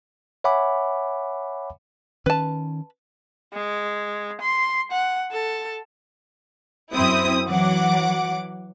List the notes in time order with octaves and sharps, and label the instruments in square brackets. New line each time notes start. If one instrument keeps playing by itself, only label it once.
[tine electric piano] C#5 E5 F#5 G#5 B5 D6
[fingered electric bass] D#3 C#4 [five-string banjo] B4 A5
[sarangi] G#3
C6
F#5
A4
[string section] F#2 C4 E4 D#6
E3 F#3 F#5 D6